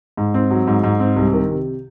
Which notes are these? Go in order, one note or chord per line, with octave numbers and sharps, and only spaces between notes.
G#2
C4
F#3
G#2
G#2
C4
C2
D#3
C3